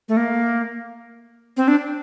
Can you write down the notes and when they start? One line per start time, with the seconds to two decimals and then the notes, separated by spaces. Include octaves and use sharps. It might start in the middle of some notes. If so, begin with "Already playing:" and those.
0.09 A3
0.17 A#3
1.57 C4
1.68 D4